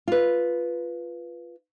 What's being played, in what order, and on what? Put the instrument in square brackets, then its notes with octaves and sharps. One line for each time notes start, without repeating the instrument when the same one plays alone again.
[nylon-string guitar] F4 B4